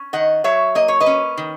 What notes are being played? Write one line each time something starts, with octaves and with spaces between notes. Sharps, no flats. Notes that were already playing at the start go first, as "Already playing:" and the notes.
Already playing: C#4
D#3 D#5 F#5
F#3 C#5 E5
A#3 D#5
C#5
B4 D#5
C#4
D#3